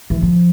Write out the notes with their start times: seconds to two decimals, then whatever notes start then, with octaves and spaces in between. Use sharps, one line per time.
0.10 E3
0.22 F3